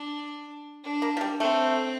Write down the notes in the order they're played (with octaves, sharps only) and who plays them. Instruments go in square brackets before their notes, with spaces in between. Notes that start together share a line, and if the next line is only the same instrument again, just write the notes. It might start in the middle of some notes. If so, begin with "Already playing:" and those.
Already playing: [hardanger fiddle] D4
D4
[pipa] A#3
F3
G3
[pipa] A3 [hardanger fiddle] C4